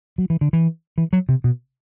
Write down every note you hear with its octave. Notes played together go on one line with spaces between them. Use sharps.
F#3
E3
D3
E3
E3
F#3
C3
B2